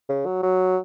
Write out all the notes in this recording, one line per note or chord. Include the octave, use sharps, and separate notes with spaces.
C#3
F#3
F#3